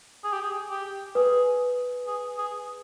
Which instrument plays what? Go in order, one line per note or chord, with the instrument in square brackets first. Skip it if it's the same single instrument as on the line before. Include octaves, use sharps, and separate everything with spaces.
[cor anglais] G#4
G4
G#4
G4
[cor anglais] G#4 [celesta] B4
[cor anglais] G#4
G#4